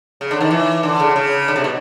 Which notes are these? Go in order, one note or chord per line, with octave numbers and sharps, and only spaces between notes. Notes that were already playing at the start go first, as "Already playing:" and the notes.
C#3
D3
D#3
E3
D3
C#3
C#3
D3
C3
B2